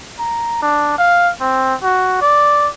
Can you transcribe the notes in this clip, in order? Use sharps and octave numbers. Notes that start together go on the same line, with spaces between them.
A#5
D4
F5
C4
F#4
D5